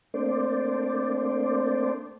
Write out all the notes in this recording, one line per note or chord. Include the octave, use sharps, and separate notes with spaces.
A3 A#3 C4 D4 C5 D5